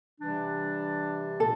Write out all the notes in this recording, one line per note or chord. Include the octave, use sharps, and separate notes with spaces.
C3 E3 G3 D4
A#2 A4